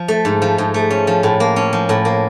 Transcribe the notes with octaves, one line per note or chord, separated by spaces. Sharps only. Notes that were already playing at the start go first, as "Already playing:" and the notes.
Already playing: F3
A3
G#2
F3
G#2
A3
C#4
F3
A2
A#3
C#4
F3
A2
A#3